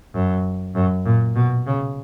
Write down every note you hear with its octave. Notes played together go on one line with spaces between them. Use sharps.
F#2
F#2
A#2
B2
C#3